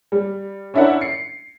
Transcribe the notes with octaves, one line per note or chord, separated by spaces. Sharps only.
G3
C#4 D4 E4 A#4 E5 F#5
C7 C#7